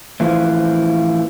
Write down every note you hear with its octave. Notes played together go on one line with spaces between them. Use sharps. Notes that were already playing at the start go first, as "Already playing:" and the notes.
A2 E3 F3 C4 F4